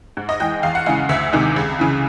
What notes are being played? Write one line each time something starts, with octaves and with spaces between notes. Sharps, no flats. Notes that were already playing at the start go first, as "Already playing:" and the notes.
G#2
D#5
E3 G#3 G5
E2 F5
F#5
C#3 E3 G#3 F5
D2 E5
C3 D#3 G#3
C#2
C#3 E3